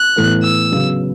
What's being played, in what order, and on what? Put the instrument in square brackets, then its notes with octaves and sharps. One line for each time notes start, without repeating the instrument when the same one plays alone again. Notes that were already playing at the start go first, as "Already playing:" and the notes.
Already playing: [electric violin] F#6
[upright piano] A2 E3 B3 A4
[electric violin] E6
[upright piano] C#3 F#3 B3